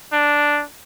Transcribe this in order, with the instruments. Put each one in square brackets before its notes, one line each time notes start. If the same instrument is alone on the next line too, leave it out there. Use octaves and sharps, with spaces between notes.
[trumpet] D4